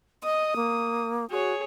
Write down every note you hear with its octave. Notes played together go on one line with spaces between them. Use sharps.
D#5 D#6
A#3
F#4 G#4 C#5